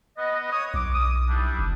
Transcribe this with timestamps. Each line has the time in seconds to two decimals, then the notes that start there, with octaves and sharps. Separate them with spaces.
0.18 B3 D#5
0.51 C#5 D#6
0.74 B1 D6
0.94 D#6
1.29 G3 D4 E4
1.59 F#1